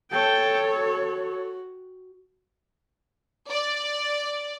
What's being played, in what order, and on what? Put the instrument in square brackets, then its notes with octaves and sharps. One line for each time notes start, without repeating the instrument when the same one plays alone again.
[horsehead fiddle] A4 C#5 [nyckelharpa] G5 A5
[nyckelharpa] F#4
[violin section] D5